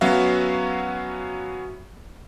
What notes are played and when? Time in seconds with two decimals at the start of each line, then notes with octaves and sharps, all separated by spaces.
0.01 F#3 B3 C#4 F#4 E5 F5